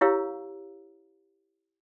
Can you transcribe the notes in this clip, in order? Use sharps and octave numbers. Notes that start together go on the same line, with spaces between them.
E4 G4 C#5 F5 A#5 E6